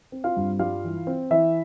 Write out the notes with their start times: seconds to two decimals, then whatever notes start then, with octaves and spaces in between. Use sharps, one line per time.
0.12 C4
0.24 F4 F5
0.36 G2
0.59 G3 F4 F5
0.84 E3
1.07 C4
1.31 E3 E4 E5